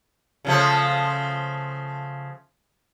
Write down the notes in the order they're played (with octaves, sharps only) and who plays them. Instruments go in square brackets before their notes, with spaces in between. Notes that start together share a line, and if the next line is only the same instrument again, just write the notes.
[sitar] C#3 F3 A3